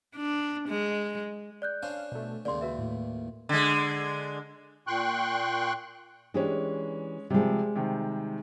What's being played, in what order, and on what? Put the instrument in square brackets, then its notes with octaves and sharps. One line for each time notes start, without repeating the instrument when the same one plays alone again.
[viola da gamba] D4
G#3
[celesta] D5 F#6 G6
[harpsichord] C#4 D4 C5 [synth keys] F5
[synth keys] B2 A3
[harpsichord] D#2 A#2 [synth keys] C#3 G#3 [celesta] D5 C6
[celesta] F#4 B4 E5
[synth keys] A2
[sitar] D3 G#3
[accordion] A#2 G5 C6 C#6 F#6
[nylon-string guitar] E3 D4 G4 [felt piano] G#3 C#4
[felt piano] C3 F3 [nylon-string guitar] G3 G#3
[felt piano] C3 D#3